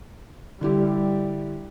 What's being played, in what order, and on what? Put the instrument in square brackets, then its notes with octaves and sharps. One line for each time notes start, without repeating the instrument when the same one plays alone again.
[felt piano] D3 E4 G4 [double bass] G3